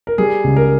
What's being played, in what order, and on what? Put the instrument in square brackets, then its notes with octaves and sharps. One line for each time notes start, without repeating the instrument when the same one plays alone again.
[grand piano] A#4
G3 G#4
C#2
A#4